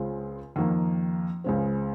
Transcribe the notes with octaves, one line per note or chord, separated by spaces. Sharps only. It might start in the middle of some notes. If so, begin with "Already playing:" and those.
Already playing: C#2 C#3 G#3 C4 F4
F2 D#3 A#3
C#2 C#3 G#3 C4